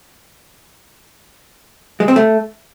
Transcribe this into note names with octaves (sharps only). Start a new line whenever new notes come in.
G#3
C4
A3